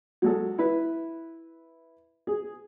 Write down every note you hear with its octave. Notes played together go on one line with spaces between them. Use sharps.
F#3 G#3 A4
E4 B4
G#4